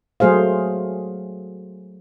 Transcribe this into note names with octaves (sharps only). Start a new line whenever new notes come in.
F#3 A3 G#4 C5 F5